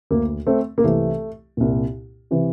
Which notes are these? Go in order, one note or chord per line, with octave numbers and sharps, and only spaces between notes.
D2 D3 A#3
A3 C4
A#3
C2 C3 E3 A3
C2 A#2
C3 E3